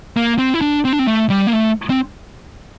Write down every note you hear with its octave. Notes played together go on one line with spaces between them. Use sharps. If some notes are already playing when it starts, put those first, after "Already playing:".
A#3
C4
E4
D4
C4
D4
C4
A3
G3
A#3
A3
C4